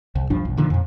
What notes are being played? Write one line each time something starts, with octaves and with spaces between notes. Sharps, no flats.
C2
A#1 G2 F3 D4
B1
A#2 D3 D#3 F3
F2 A#2